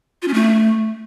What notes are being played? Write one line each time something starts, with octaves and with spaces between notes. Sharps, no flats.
F4
C#4
A3